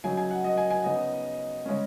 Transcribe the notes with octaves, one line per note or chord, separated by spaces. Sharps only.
C#3 F#3 D#4 G#5
G#5
F#5
D#5
G#5
G#5
C#3 B3 D#4 D#5
C#3 G#3 C#4